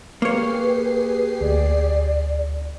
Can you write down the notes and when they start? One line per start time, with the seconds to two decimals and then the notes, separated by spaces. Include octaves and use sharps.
0.22 A#3 G4 G#4 B4 C#5 C7
1.41 D2 D5